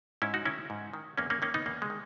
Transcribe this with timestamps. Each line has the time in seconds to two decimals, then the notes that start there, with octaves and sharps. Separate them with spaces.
0.22 G#2 C#4 E4
0.34 D#4 F#4
0.45 D#3 C#4 E4
0.70 G#2
0.93 D#3
1.18 E2 A#3 C#4
1.30 A#3 C#4
1.42 D#3 A#3 C#4
1.54 B3 D#4
1.66 E2 A#3
1.82 G#3
1.90 D#3